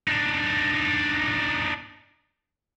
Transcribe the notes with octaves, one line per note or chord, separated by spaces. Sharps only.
D4 D#4